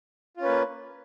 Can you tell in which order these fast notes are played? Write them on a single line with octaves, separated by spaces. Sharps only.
F4 C#4 B4 A#3